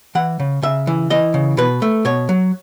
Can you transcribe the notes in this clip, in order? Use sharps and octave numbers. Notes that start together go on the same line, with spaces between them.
E3 F#5
C#3
C#3 E5
E3
E3 D#5
C#3
B2 B4
A3
B2 C#5
F#3